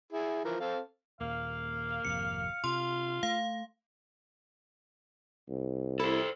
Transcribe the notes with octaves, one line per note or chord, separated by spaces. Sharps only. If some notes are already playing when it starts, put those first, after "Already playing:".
E4 G#4
E3 F3 A#4
C4 A4 F5
D#1 A#3 F5
G#1 F2 C3 C#7
C3 F4 C6
A3 F5
C2
E4 A4 C5